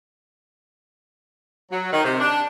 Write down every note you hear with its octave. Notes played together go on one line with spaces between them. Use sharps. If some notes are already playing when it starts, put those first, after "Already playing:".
F#3
D#3
C3
D4